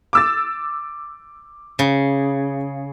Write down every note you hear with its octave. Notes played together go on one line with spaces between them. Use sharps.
D6 E6 A6
C#3